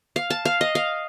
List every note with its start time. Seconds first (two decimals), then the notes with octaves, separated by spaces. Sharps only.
0.16 F5
0.30 A5
0.45 F5
0.61 D#5
0.75 F5